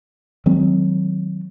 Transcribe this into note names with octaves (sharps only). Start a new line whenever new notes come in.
D#3 F#3 G#3 C4